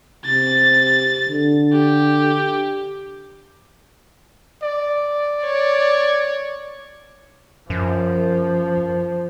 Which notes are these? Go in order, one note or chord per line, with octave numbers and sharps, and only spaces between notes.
C3 A6
D3
G4
D5
C#5
F#2 F3